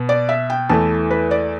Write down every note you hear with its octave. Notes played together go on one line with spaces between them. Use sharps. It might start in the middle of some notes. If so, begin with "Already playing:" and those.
Already playing: B2 B3
D5
E5
G5
E2 E3 A3 A5
B4
D5